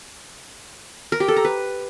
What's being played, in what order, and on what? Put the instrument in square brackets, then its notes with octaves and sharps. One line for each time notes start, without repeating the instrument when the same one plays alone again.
[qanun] A#4
G4
A4
A#5
B4